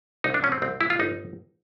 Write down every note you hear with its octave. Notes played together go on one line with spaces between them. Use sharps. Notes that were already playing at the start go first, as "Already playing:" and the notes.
C2 D#4
D4
B2 C#4
C4
C2 C4
G#3 E4
F4
G1 D#4